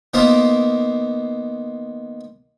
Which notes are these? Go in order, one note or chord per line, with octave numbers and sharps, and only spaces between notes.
D#3 A#3 B3 F4 A#4 C5